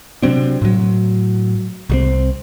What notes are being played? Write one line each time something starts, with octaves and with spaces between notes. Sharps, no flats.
C3 F#3 C4 D4
A2 F#3
C2 G3 C4